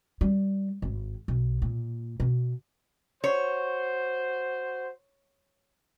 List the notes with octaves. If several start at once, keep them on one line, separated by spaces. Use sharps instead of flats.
G3
G#1
B1
A#2
B2
F#4 C5 C#5